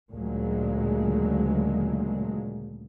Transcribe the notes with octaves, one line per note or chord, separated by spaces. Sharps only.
D2 A#2 C#3 F#3 G#3